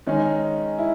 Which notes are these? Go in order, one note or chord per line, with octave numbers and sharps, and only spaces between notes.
D#3 G#3 C#4 D#4
E4